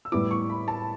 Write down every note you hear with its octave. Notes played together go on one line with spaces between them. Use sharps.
E6
A2 E3 G3 B3 E4 D6
C#6
B5
A5